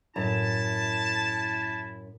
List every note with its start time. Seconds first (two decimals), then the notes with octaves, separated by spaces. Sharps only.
0.16 F#2 A2 E4 A5